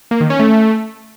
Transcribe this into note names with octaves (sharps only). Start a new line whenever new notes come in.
A#3
D#3
C#4
A3